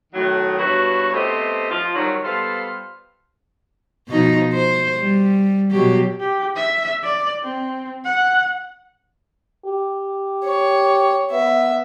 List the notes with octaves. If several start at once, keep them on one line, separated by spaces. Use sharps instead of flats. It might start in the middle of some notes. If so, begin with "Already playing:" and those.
A2 D#3 F#3
G2 B2 E4 F#4 B4 C#5
A3 B3 C4 G4 C5 D#5
F3 F4
D#3 F#3 G3
G3 B3 F4 A4 C5 F5
B2 F3 D#4
C5
G3
B2 F#3 G4
G4
E5
D5
C4
F#5
G4
C#5
B3 E5